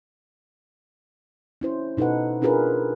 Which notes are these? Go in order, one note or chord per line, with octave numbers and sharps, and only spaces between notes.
C#4 E4 C5
B2 D#4 A4 B4 F#5
C#4 D4 F4 G#4 A#4 B4